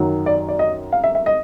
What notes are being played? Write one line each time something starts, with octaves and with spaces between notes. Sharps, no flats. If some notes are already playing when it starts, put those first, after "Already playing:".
Already playing: F#2 D#3 F#3
D5
D5
D#5
F5
E5
E5
D#5